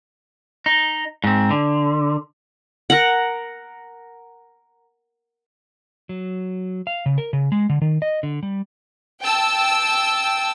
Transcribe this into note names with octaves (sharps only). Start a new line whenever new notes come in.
D#4
G#2 C4
D3
A#4 F#5
F#3
F5
C#3
A#4
C#3
G#3
D3
D#3
D#5
D3
G3
G5 A5 E6